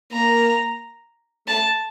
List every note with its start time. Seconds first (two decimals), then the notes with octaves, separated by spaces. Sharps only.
0.12 A#3 A#5
1.47 A3 A5